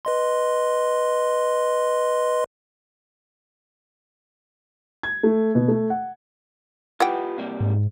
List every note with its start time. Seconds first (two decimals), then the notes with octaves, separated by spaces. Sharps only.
0.05 B4 D#5 C6
5.03 G#6
5.23 A3
5.55 B2
5.68 A3
5.90 F#5
7.00 E3 F4 G4 B4 F#5 G5
7.38 C3 G3 A#3
7.61 G#2